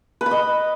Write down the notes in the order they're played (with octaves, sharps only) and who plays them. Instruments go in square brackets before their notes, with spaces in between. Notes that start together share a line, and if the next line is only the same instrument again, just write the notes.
[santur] B4
B5
D#5